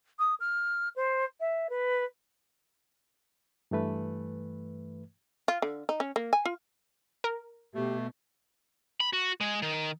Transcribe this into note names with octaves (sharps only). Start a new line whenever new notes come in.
D#6
F6
C5
E5
B4
G2 E3 A3 B4
F4
D3
D#4
C#4
A#3
G#5
F4
A#4
B2 A3 G4
B5
F#4
G#3
D#3